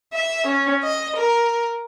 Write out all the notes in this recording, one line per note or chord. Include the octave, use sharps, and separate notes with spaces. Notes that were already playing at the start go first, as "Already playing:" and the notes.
E5
C#4
D#5
A#4